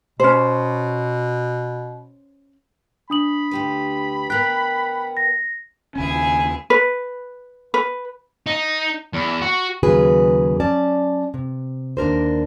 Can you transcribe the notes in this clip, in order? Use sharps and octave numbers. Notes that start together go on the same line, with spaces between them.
B2 C#4 C5
D4 B5 D#6 F#7
D2 G4 B4
B3 A#4 G5 F#6 B6
A#6
D#2 C#3 C#4 E4 G#4 G#5
B4
B4
D#4
E2
F#4
D#2 C#3 F#3 G#4 B4
F#3 C#4 D5 A5
C3
D#2 D4 A#4 C5